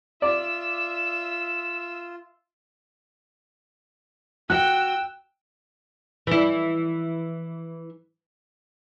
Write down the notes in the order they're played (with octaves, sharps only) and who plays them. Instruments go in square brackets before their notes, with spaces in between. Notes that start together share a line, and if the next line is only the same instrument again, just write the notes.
[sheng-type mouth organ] F4 [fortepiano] D5 [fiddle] E5 E6
[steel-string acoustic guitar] F#4 [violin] G5 E6 [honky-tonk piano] F#6
[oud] E3 E4